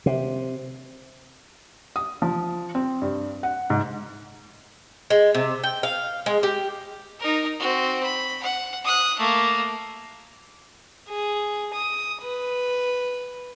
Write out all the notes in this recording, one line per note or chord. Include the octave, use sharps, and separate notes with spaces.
C3
D#6
F3
C4
G2
F#5
G#2
G#3
C3
G5
F5
G#3
G4
D#4 A#4
C4 F#4
B5
F#5
D#6 F#6
A3 A#3
G#4
D#6
B4